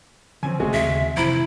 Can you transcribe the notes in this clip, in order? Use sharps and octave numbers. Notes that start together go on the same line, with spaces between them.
D3 E3 F3 C4 C#4 G#5
F#1 C3 G#3 A3 F#4
D#2 C#3 E5
F1 C3 E3 E4 C5 A#5 B5